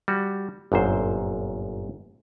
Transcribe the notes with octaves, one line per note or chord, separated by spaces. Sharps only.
G3 F#4
G1 F#2 A#2 C5